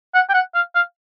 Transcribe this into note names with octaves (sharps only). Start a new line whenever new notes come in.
F#5
G5
F#5
F5
F5